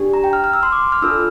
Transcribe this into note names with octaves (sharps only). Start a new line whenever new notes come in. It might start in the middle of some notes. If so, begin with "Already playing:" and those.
Already playing: D4 G4
A#5
G5
F6
F6
E6
C6
D6
F6
D4 F4 A4 E6